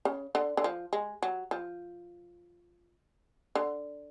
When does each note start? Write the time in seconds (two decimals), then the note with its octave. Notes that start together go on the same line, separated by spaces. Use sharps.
0.05 C#3
0.35 D3
0.57 D3
0.64 F3
0.93 G#3
1.23 F#3
1.51 F3
3.55 D3